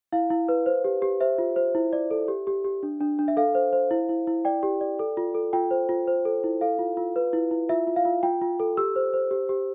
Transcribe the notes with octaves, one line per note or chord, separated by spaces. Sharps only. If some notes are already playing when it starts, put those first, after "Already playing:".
E4 F5
E4
B4
C5
G4
G4
C5 E5
F4
C5
E4
D5
A4
G4
G4
G4
D4
D4
D4
E5
A4 F5
C5
C5
E4
E4
E4
D5 G5
G4
D5
A4
F4
A4
F4 G5
C5
F4
C5
A4
E4
A4 F5
F4
F4
B4
E4
E4
F4 E5
F4
F5
F4
F4 G5
F4
A4
G4 E6
C5
C5
G4
G4